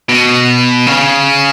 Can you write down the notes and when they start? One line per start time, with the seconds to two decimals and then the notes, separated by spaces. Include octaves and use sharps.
0.09 B2
0.87 C#3